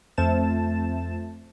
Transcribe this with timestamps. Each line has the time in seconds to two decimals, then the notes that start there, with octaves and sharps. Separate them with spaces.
0.18 F2 A3 C5 A5 A6 E7